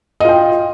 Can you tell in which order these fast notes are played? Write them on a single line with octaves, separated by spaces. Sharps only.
D#5 F4 G5